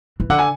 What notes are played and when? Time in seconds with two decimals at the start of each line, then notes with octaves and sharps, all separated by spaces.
0.20 E3
0.30 D3 F#5
0.39 G#5